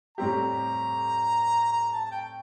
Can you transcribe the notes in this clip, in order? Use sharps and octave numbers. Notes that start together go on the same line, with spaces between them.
A2 G3 C4 G4 A#5
A#5
A5
A5
G5